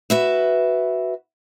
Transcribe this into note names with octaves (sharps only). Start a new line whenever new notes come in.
F#4 B4 E5